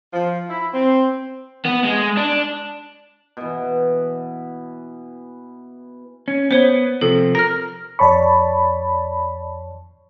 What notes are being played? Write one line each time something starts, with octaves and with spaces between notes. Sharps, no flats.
F3
E4
C4
B3
G#3
D4
B2 E3
C#4
B3 C5 C#5 G7
C3 F3 A4
A#4 F6 A#6
F2 C#5 D5 A5 B5 C#6